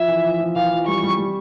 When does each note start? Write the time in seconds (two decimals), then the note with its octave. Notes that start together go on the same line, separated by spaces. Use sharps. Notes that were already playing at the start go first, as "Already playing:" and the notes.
Already playing: F3 E5
0.08 E3
0.24 F3
0.40 F3
0.56 E3 F5
0.72 F3
0.87 G3 C#6
1.03 G3
1.18 G3